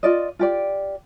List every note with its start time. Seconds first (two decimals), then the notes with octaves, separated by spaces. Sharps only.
0.03 F4 D5 D#5
0.39 F4 G4 D5